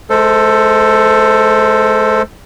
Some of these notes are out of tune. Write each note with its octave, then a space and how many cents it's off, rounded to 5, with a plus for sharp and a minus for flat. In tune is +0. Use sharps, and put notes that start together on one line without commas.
G#3 +40 A4 +10 C5 -10